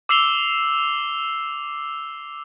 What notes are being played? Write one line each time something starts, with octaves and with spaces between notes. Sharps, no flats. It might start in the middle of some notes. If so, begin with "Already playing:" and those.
D6 E6 C7 F7 G7